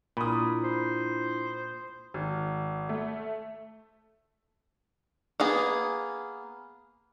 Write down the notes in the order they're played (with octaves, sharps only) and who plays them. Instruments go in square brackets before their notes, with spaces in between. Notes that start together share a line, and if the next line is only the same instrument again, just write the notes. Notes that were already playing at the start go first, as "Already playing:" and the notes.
[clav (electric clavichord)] A#2 [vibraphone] D4 E4 F4 [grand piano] B5 D#6
[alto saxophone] C5
[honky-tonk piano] G#1
A3
[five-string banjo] A#3 B3 G#4